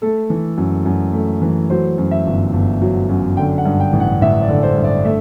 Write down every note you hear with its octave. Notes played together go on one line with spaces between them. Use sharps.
A3 A4
E3
F#2
F#2
A3
E3
F#3 C5
F#2
E5
G1
G1
F#3
F#2
D3 G5
F#5
G2
G5
A1
F#5
A1 E5
D5
D3
C5
G2
D5
A3 E5